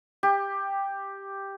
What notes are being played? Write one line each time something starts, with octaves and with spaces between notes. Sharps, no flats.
G4